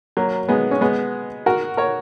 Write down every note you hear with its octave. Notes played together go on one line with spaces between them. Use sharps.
F#3 A#3
G#3 B3
C#4
G#3 B3
F#4 A#4
A#4 C#5